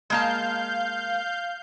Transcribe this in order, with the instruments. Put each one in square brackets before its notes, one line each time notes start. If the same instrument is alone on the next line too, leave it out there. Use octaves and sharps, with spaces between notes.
[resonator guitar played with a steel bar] G#3 A#3 A5 [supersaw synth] F5 G6